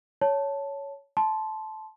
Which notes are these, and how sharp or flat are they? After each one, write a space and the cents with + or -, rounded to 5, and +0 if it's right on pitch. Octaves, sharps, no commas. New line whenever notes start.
C#5 +10 A5 +0
A5 -15 C6 +0